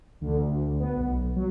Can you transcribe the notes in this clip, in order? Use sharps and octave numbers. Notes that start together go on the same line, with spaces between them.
D2
D2
B3
B1
F#3